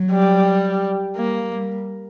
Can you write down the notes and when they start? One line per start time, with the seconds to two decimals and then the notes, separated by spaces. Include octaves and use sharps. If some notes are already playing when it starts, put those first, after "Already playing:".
Already playing: F#3
0.12 G3
1.17 G3 A#3
1.52 G3